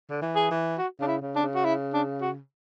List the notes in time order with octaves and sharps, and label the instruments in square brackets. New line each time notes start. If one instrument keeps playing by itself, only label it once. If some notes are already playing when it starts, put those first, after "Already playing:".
[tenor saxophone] D3
E3
[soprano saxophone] G#4
[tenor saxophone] E3
[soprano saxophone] F#4
[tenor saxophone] C#3 [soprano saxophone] D4
[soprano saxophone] E4
[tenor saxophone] C#3
[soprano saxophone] D4
[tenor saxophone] C#3
[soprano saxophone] F#4
E4
D4
F#4